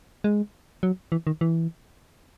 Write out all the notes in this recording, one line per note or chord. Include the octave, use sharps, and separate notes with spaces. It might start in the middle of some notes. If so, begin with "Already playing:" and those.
G#3
F#3
E3
D#3
E3